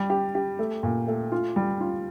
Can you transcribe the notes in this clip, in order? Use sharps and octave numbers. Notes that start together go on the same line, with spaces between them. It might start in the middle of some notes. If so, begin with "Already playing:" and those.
Already playing: G3
G4
G4
A3
A#2
A3
F4
G3
F4